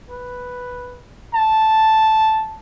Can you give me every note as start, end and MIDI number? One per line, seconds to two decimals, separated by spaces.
0.10 0.98 71
1.34 2.60 81